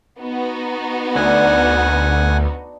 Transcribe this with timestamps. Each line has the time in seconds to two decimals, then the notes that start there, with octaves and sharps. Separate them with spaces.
0.20 B3 D#4 F#4
1.15 D2 D4 F#5 G#5